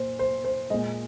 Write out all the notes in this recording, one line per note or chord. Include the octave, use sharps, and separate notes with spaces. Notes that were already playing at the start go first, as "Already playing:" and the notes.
Already playing: A#2 C5
C5
C5
A#2 G#3 D#5